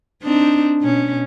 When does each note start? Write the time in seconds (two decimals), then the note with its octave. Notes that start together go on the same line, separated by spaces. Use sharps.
0.23 C4 D4 D#4
0.82 B2 C#4